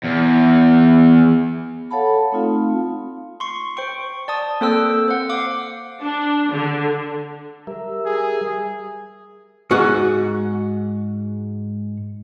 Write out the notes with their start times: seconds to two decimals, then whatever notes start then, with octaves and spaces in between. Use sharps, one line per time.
0.04 E2
1.90 A4 C#5 F5 F#5 A5 B5
2.32 A3 C4 D#4 F4 F5
3.40 C6 C#6
3.77 C5 G5 C#6
4.28 D5 A5 D#6
4.61 A#3 C4 A4 C5 G5 E6
5.08 C5 F#5
5.29 F5 D6
6.00 D4
6.50 D3
7.67 G3 A#4 E5
8.06 G#4
9.71 G#2 F#4 D#5 F#5